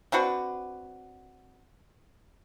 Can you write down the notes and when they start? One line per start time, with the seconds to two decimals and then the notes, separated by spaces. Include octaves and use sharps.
0.12 C4 D4 F#4 B4